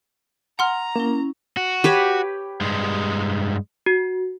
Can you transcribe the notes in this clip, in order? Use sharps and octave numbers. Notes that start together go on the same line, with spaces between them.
F#5 A#5 C6 F6
A#3 C#4 E4
F#4
G4 B4 C#5
G2 G#3
F#4